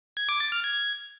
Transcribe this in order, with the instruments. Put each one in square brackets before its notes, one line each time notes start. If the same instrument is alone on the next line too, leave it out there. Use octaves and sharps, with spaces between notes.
[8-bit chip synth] G#6
D6
A6
F6
G#6